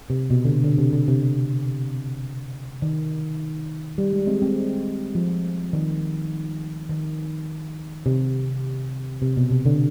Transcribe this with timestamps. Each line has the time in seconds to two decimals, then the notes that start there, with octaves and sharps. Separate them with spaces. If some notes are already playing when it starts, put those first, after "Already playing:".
0.10 C3
0.30 B2
0.45 D3
0.49 C3
0.64 D3
0.78 C3
0.93 D3
1.08 C3
2.82 D#3
3.98 G3
4.13 G#3
4.27 G#3 C4
4.42 G#3 C4
5.15 F3
5.73 D#3
6.90 D#3
8.06 C3
9.22 C3
9.37 B2
9.51 C3
9.66 D3